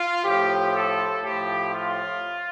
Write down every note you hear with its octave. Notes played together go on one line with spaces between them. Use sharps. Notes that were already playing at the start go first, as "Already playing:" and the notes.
Already playing: F4
A2 F3 G4
A4
A2 F3 G4
F4